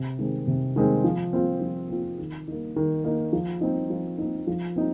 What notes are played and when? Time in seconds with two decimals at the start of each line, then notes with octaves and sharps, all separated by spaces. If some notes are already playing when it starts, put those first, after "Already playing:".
Already playing: C3
0.19 D#3 G#3 C4
0.47 C3
0.76 D#3 G#3 C4
1.04 F3
1.33 C4 F4
1.61 F3
1.90 C4 F4
2.19 D#3
2.48 A#3 D#4
2.76 D#3
3.04 A#3 D#4
3.33 F3
3.61 C4 D#4
3.90 F3
4.18 C4 D#4
4.47 F3
4.76 C4 D#4